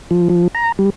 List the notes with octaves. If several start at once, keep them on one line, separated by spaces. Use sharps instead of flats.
F3
F3
A#5
G3